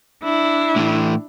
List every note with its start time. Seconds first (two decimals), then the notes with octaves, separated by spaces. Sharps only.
0.24 D4 E4
0.76 A2 E3